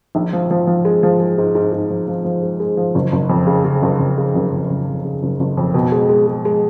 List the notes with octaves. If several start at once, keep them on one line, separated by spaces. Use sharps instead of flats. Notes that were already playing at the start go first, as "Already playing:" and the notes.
A#1
F3
F3
F3
G#3
F3
G#3
G#2
G#2
G#2
F3
F3
F3
G#3
G#3
F3
F#1
F#1
F2
C#3
C#3
F#1
F#1
C#3
F#1
F2
F#1
F2
C#3
F#1
F#1
F2
B2
G#3
G#3
G#3
G#3